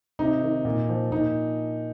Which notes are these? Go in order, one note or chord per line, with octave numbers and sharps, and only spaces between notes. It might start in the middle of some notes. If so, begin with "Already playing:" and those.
C3 D#4
D#3
A#2
F3
A#2 D#4